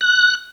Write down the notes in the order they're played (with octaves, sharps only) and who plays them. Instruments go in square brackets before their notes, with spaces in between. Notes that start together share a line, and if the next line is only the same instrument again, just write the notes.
[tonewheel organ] F#6